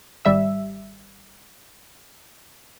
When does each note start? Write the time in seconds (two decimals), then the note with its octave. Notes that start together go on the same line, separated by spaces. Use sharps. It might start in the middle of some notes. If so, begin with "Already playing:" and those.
0.25 G#1 G3 E5 E6